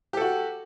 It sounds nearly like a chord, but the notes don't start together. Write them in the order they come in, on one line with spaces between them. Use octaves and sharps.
G4 A4 F#4